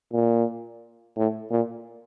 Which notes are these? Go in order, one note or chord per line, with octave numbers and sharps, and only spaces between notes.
A#2
A2
A#2